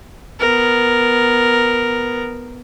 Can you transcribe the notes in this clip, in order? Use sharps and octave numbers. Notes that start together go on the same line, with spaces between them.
B3 A#4